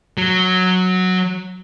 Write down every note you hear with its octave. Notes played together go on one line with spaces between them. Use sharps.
F#3